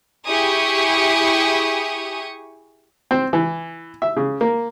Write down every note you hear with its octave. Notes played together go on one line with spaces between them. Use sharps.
E4 G4 G#4 C#6 D#6
C4
E3
E5
C#3
A#3